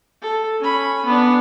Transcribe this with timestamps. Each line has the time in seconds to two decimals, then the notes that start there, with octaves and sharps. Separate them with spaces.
0.22 A4
0.61 C#4 B5
1.06 B3 D4